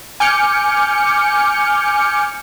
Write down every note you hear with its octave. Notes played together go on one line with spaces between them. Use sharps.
G#5 D6 F6 G6 C#7